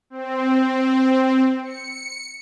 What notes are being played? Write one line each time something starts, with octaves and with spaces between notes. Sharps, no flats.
C4
C#7